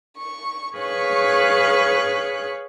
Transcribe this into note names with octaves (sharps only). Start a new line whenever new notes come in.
C#6
G#4 B4 C#5 F5 C#6 F#6